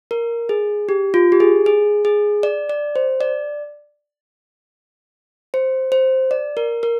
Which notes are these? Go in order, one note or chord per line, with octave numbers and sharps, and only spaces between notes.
A#4
G#4
G4
F4
G4
G#4
G#4
G#4
D5
D5
C5
D5
C5
C5
D5
A#4
A#4